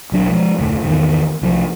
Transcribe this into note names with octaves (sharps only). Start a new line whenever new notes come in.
B1 F#3 D4
F3 G#3
F1 D2 A2
G#1 E2 B2 D#3
C2 E3 F3